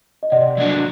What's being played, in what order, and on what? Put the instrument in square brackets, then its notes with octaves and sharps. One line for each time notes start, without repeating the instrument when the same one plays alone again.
[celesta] D#5
[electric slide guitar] C3 [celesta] D5 F#5
[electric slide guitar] F#3 A#3 D4 F#4